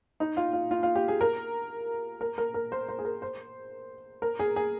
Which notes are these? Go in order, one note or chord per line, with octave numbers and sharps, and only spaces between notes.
D#4
F4
F4
F4
F4
G4
G#4
A#4
A#4
A#4
A#4
C5
C5
G#4
A#4
C5
A#4
G#4
G#4